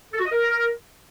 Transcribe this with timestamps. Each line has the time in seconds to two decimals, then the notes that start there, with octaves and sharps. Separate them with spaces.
0.13 A4
0.19 F#4
0.25 D#5
0.32 A#4